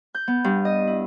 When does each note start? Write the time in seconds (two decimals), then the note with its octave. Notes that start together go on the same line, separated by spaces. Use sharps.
0.15 G6
0.27 B3
0.44 G2
0.65 D#5
0.87 E4